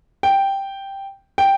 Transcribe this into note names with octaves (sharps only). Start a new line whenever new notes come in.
G5
G5